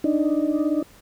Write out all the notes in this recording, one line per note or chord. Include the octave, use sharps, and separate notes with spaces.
D4 D#4